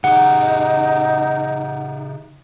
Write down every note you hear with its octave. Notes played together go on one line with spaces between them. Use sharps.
C#3 D#4 G4 G#4 F#5